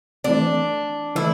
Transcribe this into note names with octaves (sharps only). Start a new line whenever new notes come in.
E3 A3 C4 D4
E3 A3 E4